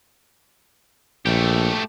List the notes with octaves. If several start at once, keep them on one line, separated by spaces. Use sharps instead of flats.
A#1 A3 G4